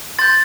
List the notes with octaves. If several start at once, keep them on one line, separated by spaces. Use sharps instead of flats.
C6 G6 A6